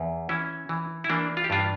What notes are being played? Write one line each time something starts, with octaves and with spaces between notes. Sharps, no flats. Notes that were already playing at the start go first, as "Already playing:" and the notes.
Already playing: E2
E3 C#4 E4
E3
E4
E3 A#3 D4
F4
G4
G2 D4 F4